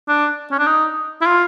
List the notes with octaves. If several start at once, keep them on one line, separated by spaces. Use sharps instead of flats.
D4
C#4
D4
D#4
E4
F4